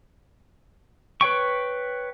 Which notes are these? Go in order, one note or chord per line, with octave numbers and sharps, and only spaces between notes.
B4 C#5 G5 C#6